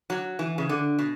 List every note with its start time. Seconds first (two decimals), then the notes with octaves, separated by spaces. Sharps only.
0.10 F#3
0.39 E3
0.58 C#3
0.69 D3
0.99 B2